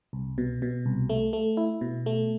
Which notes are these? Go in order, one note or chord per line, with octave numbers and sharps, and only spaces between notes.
C2
B2
B2
C2
A3
A3
E4
B2
A3